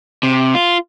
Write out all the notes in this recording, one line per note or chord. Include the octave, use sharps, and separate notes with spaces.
C3
F4